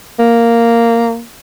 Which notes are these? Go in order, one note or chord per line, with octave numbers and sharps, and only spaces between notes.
A#3